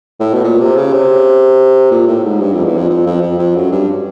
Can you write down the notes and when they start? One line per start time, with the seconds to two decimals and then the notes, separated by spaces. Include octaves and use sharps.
0.20 A2
0.34 B2
0.44 A#2
0.60 C3
0.77 C#3
0.93 C3
1.91 A#2
2.07 A2
2.24 G#2
2.41 G2
2.53 F2
2.64 E2
2.77 F2
2.89 F2
3.06 F2
3.22 F2
3.39 F2
3.56 F#2
3.72 G2